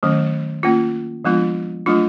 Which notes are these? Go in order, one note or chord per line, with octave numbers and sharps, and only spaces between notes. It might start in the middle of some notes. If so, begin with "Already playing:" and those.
D#3 F#3 A3 C#4
A#3 C#4 F4
F3 G#3 B3 D4 F4
F#3 A3 D4 F4